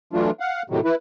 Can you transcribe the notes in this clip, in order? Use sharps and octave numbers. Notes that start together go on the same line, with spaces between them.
E3 F#3 A3 D4 F4
F5 F#5
A2 C3 D#3 F#3
E4 B4